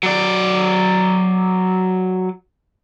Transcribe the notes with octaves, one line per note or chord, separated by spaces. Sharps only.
F#3 D5